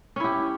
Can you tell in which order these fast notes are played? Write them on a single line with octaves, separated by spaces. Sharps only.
C#4 E4 G4